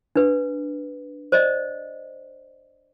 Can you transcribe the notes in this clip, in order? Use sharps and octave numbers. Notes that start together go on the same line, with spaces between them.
D4 B4
C5 D5 D#5